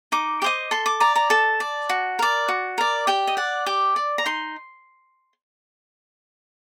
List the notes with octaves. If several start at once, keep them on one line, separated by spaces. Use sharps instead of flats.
D#4 D6
G4 C5 D#5 D6
A4 C6
D6
D5 A#5
A#5
A4 A5
D5
F#4
A#4 D5
F#4
A#4 D5
G4 G5
D#5
D5 F#5
G4 D6
D5
A#5
D#4 C6